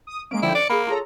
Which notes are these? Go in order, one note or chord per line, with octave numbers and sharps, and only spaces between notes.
D#6
G#3 A#3 C#4 D7
D3 F3 E4 G5
D5 C#7
A#3 G#4 B5
F4 G#4 A4 C#5 A#5